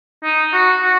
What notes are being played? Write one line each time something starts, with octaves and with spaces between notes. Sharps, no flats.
D#4
F#4
F#4